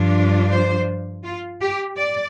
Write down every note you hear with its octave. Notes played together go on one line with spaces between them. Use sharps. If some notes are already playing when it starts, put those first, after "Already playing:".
Already playing: G2 F3 D4 F4
C5
F4
G4
D5